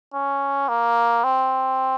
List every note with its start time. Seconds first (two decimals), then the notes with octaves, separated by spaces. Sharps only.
0.14 C#4
0.69 A#3
1.24 C4